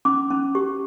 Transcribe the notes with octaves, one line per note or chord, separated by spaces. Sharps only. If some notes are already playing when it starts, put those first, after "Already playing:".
C#4 D6
C#4
G4